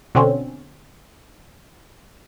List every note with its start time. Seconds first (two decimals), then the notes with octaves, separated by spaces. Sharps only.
0.15 B2 D3 C4 C#4